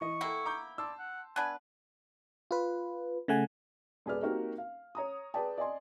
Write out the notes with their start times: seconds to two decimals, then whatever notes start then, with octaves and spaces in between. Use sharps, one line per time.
0.01 E3 D#5 C#6
0.21 A#3 B3 E4 A4 G5
0.46 A#5 D6 G6
0.78 D5 A5 C6 E6
0.99 F#5
1.36 B3 D4 B4 G#5
2.51 F4 B4
3.28 C#3 A3 F#5 G#5
4.06 D#1 G#4 B4 D5 F6
4.23 A#3 C4 D#4 F#4 G4 A#4
4.58 F5
4.95 C#5 A#5 D#6
5.34 G#4 B4 D5 G5 A5
5.58 D5 D#5 G#5 C6